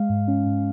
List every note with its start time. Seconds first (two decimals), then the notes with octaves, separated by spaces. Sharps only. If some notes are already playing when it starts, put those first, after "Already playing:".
Already playing: G#3 F5
0.09 G#2
0.28 C#4
0.46 G#2